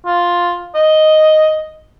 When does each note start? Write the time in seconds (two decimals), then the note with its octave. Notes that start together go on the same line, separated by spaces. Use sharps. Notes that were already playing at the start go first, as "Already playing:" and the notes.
0.06 F4
0.75 D#5